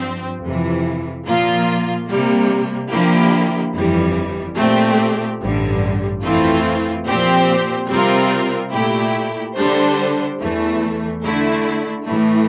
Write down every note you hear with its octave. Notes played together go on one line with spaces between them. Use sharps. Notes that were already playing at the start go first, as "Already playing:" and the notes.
Already playing: G2 F3 C4
F2 C3 E3
A#2 F3 A#3 F4
C3 G3 A#3
D3 F3 A#3 E4 G4
G1 F2 E3 G3
A#2 A3 C4 G4
A1 G2 D3 G3
F2 E3 A3 C4 F4
A#2 F3 C4 G4 C5
C3 G3 C4 F4 A#4
A#2 A3 E4 G4
D3 G3 D4 A4 C5
E2 E3 A3
D3 A3 E4
A2 E3 A3